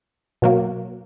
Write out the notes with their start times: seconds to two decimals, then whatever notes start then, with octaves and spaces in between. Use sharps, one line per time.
0.42 B2 F#3 A#3